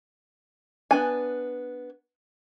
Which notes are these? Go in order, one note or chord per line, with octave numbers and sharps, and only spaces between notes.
B3 D4 G#5